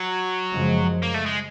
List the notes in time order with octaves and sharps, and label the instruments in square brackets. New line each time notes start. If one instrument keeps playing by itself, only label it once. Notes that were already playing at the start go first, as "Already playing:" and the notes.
Already playing: [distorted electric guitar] F#3
[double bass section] F#2 C#3 F3 G#3
[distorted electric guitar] A#3
A3
G#3